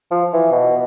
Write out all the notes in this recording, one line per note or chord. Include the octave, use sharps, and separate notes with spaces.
F3
E3
B2